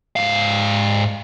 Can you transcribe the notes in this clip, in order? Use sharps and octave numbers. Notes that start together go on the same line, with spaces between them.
G#2 F5